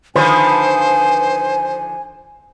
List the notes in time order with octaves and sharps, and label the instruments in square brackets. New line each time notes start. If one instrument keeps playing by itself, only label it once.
[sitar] D3 D#3 F3 [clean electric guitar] B4 [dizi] C5 [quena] G#5